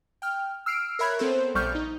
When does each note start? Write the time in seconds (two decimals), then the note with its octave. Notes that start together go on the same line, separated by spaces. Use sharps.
0.22 G5 F6
0.66 E6 F6 C7 D7
0.99 A#4 C#5 E5 B5 F#6 G#6
1.19 B3 C4 A4 C5
1.55 A#1 G3 C#6 F6 G6
1.75 D#4